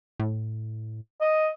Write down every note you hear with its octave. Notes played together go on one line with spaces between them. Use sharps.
A2
D#5